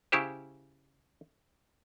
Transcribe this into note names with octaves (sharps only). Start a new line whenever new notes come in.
C#3 E4 G4 C5